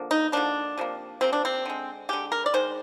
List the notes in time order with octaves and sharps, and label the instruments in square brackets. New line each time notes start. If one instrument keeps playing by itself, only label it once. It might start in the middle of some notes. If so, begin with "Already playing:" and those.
Already playing: [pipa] D3 F3 A#3
D#4
D3 F3 A#3 D4
C3 F3 A#3
C3 F3 A#3 C4
D4
C4
D3 G#3
D3 G#3 G4
A#4
D5
D#3 G#3 C5